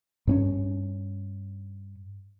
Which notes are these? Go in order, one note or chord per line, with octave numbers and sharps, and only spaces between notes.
G2 C4 C#4